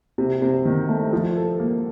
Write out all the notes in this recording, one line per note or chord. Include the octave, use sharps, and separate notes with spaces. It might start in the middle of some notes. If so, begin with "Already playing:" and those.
C3
C3
D#3
A3
F3
A4
A#3